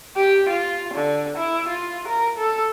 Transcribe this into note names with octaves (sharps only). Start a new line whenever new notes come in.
G4
F4
D3
E4
F4
A#4
A4